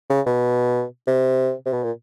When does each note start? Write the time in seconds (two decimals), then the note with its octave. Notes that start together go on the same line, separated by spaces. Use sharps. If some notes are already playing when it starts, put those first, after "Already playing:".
0.09 C#3
0.26 B2
1.07 C3
1.65 C3
1.73 B2
1.83 A#2